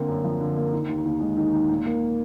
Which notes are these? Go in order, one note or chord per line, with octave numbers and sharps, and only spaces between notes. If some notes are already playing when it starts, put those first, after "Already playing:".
Already playing: D3 A#3 C4
F#2
F3
D3
A#3
D#3
D#2
D#2
G#3
D#3
D#2
A#2
A#3